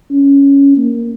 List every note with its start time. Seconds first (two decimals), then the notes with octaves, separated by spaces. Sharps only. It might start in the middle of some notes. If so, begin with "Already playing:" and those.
0.11 C#4
0.77 A#3